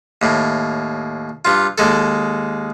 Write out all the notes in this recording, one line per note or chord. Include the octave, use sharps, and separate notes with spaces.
D#2 A2
G2 F4
D#2 G#3 A4